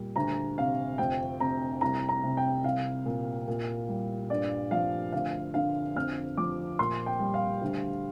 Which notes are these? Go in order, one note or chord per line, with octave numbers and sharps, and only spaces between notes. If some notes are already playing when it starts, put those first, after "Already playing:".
Already playing: A#2 G3
D2 A#5
C3 F5
F2 G5
C3 A#5
C2 A#5
A#5
C3
G5
C2 F5
A#2
A#2
G3
G2 D5
F3 F5
D2 F5
D3 F5
F2 F6
F3 D6
A#2 C6
G5
G3
F5
D2